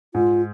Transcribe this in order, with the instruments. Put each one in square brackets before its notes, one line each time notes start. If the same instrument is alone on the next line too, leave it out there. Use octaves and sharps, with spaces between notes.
[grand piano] G#2 [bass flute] F4